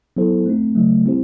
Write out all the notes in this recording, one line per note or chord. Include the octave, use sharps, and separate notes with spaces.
F#3 B3 E4 A4 C5
A3 C4 D#4
C#3 F#3 A3
G3 C4 E4 G4 C5